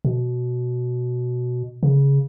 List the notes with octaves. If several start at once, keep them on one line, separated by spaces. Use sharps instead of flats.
B2
C#3